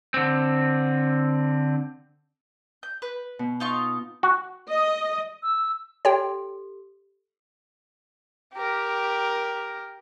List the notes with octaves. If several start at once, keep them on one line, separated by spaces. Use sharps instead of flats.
D3 C4
G6
B4
B2
D#4 F4 C#6
F#4
D#5
E6
G4 A4 C#5 G5
G4 A#4